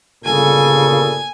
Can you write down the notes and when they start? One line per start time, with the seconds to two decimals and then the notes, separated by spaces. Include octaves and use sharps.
0.25 G1 A#2 C#3 A4 G#5